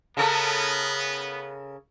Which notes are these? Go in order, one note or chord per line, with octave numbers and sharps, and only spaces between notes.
C#3 B3 A4 A#4